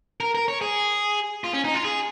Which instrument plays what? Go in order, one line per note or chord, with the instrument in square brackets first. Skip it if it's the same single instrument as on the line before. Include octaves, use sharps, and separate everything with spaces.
[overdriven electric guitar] A#4
A#4
C#5
G#4
F4
C#4
D#4
F4
G#4